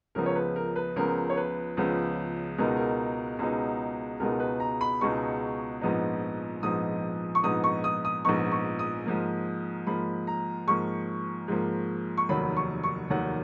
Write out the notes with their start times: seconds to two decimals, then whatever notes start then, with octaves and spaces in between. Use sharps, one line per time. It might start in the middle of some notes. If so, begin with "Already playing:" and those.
0.15 C#2 C#3 F3 B3 A#4
0.26 C#5
0.36 B4
0.56 A#4
0.76 B4
0.96 C#2 C#3 F3 B3 A#4
1.30 C#5
1.37 B4
1.77 C#2 C#3 F3 B3
2.58 C#2 B2 G#3 B3 D#4 A#4
2.76 A#4
3.39 C#2 B2 G#3 B3 D#4
4.20 C#2 B2 G#3 B3 D#4 A#4
4.40 B4
4.60 A#5
4.81 B5
5.01 C#2 B2 G#3 B3 D#4 C#6
5.81 A#1 G#2 F3 B3 D#4
6.63 A#1 G#2 F3 B3 D#4 D#6
7.35 C#6
7.43 A#1 G#2 F3 B3 D#4 D#6
7.64 C#6
7.84 D#6
8.05 D#6
8.25 A#1 G#2 F3 B3 D#4 C#6
8.52 C#6
8.79 D#6
9.06 G#2 F3 A#3
9.87 G#2 F3 A#3 B5
10.27 A#5
10.67 G#2 F3 A#3 C#6
11.48 G#2 F3 A#3
12.17 C#6
12.29 F1 D#2 D#3 F#3 B5
12.57 C#6
12.84 C#6
13.10 F1 D#2 D#3 F#3 F#5